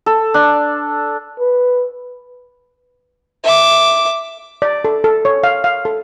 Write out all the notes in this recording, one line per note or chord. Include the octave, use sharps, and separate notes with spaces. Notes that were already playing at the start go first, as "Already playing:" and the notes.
A4
D4
B4
E5 D6
D5
A4
A4
C#5
F5
F5
A4